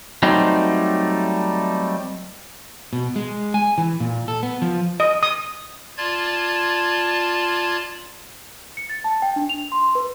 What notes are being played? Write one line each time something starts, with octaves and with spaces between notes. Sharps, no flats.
F#3 G3 A3 C4 D#4
B2
G#3
G#5
E3
A#2
A4
B3
F3
D#5
D#6
F4 D5 A5 G#6
C#7
A6
A5
G5
D4
F7
C6
B4